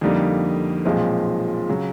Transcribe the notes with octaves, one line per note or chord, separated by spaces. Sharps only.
F2 D3 G3 A#3 D#4
B1 A#2 F3 G#3 C4
C#3 F#3